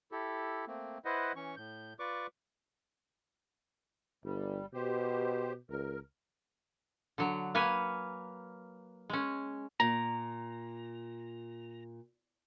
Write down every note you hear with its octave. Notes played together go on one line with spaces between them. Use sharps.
E4 G4 A4
A3 A#3 C4
E4 B4 C5 D#5 F#5
E3 C#4 C#6
A2 G6
F4 B4 D5 C#6 D6
G1 G3
B2 G4 C5
C#2 A#4
D3 F#3
A#3 B4 C#5 G#5
G#3 C#4
A#2 A#5